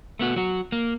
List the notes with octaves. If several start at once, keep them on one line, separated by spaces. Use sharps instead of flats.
A3 B3 F#4
F#3 F#4
A#3